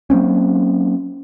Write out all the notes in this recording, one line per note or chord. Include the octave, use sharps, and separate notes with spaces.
F#3 A#3 C4 C#4